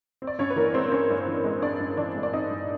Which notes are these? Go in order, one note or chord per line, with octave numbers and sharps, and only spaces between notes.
C4
D5
G2 C#4 C#5
B4
E3 A#3 A#4
G#3 C4 C5
C4 C#4 C#5
G2
E3
G#3
C4 D4 D5
G2
E3 D4 D5
G#3
D5
C4 D#4 D#5
G2